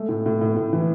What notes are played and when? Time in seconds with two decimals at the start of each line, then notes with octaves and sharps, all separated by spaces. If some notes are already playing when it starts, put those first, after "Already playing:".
Already playing: G#3 A3
0.09 A2
0.26 A2
0.41 A2
0.56 A2
0.73 E3